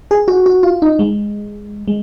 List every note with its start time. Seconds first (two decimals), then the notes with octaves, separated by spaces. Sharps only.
0.11 G#4
0.28 F#4
0.46 F#4
0.63 F4
0.82 D#4
0.99 G#3
1.88 G#3